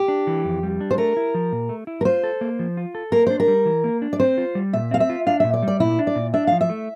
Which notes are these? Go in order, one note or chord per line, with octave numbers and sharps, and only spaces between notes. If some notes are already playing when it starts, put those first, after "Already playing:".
Already playing: G4
D4
E3
F2
G3
D4
C5
A3 A#4
E4
F3
A#2
A3
E4
A#4
F4 C5
A4
A#3
F3
F4
A4
A#3 A#4
D4 C5
A#4
G3
E3
A#3
D4
D5
C4 C5
F4
G3
A#2 E5
C4 F5
E5
F4
D4 F5
A#2 E5
D5
G3
D5
A#2 E4
D4
D5
A#2
D4 E5
F3 F5
E5
A3